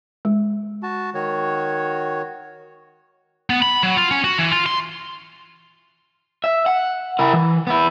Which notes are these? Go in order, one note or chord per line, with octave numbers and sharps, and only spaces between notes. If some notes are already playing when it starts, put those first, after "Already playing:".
G#3
F#4 A5
D#3 F#4 C#5
B3
B5
F#3
F4
C#4
F#4
E3
F4
C6
E5
F#5
E4 A#4
E3
B3 E4